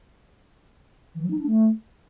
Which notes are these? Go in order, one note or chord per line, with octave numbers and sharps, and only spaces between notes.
E3
F#3
D#4
D4
A3